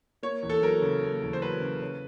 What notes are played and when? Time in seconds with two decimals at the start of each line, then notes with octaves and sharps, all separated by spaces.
0.23 A#3 C#5
0.43 E2
0.50 A4
0.62 F#3 A#4
0.82 C#3
1.03 A#3
1.22 E2
1.33 C5
1.42 F#3 B4
1.62 C#3
1.82 C#4